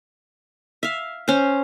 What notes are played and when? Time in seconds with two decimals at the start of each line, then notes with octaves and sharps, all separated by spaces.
0.83 E5 F5
1.28 C#4 C5